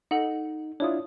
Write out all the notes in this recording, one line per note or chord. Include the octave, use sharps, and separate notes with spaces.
D#4 A4 D#5 F#5
D4 E4 F4 C#5 D#6